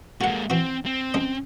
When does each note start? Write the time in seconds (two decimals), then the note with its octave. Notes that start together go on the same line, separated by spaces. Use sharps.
0.21 G#3 A#3 F#4 F#5
0.50 E3 C4 F#4
0.86 C4
1.14 C#2 G#3 D#5